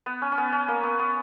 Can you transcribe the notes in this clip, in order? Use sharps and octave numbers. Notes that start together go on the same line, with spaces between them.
B3
C#4
C#4
B3
C#4
A#3
B3
B3